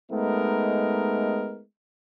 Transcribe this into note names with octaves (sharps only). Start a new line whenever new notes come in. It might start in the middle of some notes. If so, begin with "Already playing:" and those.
G#3 A3 B3 D#4 A#4